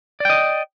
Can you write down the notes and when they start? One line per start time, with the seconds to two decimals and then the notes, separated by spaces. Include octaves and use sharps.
0.20 D5
0.25 G5
0.30 D#5